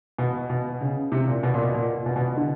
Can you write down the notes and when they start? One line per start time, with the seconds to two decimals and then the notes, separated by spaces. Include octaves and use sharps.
0.18 B2
0.50 B2
0.81 C#3
1.12 C3
1.28 A#2
1.43 B2
1.54 A#2
1.64 B2
1.75 A#2
2.06 B2
2.16 B2
2.37 D3